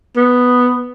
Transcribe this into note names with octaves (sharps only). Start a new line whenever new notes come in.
B3